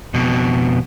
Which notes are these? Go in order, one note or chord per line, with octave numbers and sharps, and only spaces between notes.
F2 B2